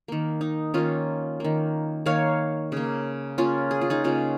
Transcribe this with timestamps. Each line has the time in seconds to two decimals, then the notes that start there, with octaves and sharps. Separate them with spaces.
0.08 D#3 A#3
0.41 D#4
0.74 D#3 A#3 C#4 F4
1.40 D#3 A#3
2.06 D#3 A#3 C#5 F5
2.72 C#3 A#3
3.38 C#3 A#3 C#4 F4
3.71 G#4
3.81 F4
3.90 D#4 G#4
4.04 C#3 A#3 C#4 F4